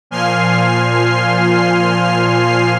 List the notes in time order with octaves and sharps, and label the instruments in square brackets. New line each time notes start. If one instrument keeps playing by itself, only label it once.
[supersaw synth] A#2 F3 G#5 C6 F6 C7